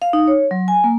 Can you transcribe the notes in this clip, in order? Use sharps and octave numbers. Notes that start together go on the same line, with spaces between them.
F5
D#4
C#5
F#3
G#5
A#3